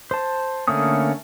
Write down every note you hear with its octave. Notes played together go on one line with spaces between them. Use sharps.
C5 A5
D3 A3 A#3 C#4 D#6